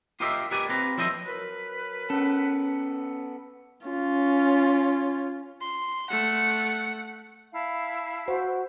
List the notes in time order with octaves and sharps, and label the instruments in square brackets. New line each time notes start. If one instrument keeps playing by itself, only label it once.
[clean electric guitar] F4 G4 A#4 C5 D#5 E5
G4 A#4 B4 D5 F#5 G#5
C4 F4 B4 A#5
F3 F#3 E4 A4 C5 D#5
[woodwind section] F#3 A#4 B4
[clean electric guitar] B3 A4 [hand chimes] C#4
[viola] C#4 F4
[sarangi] C6
[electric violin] A3 C#7 [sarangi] F#5
[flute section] E4 F5 A5
[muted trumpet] F#4 [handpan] C5